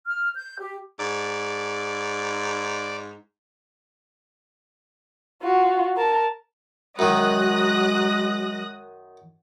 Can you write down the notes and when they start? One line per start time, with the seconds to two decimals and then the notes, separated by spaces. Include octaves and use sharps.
0.05 F6
0.33 G6
0.59 G4
0.99 G#2 D5
5.43 F4 F#4
5.97 A#4 A5
6.99 F#2 D#3 F#3 G#3 D#6 F#6 A#6